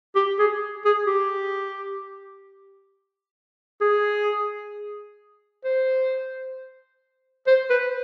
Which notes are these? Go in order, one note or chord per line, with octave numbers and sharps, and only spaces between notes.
G4
G#4
G#4
G4
G#4
C5
C5
B4